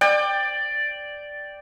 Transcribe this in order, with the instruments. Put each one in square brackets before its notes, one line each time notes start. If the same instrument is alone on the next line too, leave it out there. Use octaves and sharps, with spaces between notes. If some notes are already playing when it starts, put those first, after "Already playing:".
[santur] D5 G5